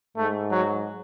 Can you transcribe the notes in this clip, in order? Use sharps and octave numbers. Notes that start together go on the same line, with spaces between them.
G#2 A3
F#3